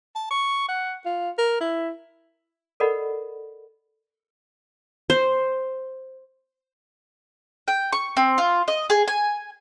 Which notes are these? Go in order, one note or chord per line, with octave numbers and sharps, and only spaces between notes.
A5
C#6
F#5
F4
A#4
E4
A4 A#4 D5 D#5 F#5 B5
C5
G5
C#6
C4
F4
D#5
G#4
G#5